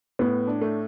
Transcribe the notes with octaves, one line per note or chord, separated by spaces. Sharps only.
A2 B3
D4
A3